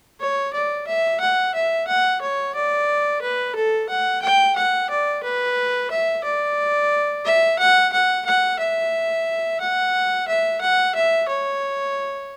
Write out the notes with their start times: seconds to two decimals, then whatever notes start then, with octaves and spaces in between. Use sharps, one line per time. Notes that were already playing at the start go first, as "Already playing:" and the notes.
0.20 C#5
0.53 D5
0.87 E5
1.21 F#5
1.54 E5
1.88 F#5
2.21 C#5
2.55 D5
3.22 B4
3.56 A4
3.89 F#5
4.22 G5
4.56 F#5
4.90 D5
5.23 B4
5.91 E5
6.24 D5
7.25 E5
7.59 F#5
7.93 F#5
8.26 F#5
8.59 E5
9.60 F#5
10.28 E5
10.61 F#5
10.95 E5
11.28 C#5